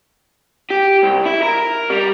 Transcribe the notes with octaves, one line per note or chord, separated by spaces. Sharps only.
G4
C2
E4
A#4
G3